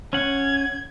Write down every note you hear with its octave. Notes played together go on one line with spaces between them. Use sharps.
C#4 F#5 G#6